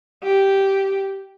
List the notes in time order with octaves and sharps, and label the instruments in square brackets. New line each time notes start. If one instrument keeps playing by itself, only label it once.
[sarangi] G4